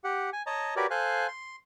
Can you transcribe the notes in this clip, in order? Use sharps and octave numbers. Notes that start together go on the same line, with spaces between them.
G4 F#5
G#5
C#5 D#5 A5 A#5
F#4 G4 A#4 B4 C#5 D5
A4 C5 F5 G#5 F#6
C6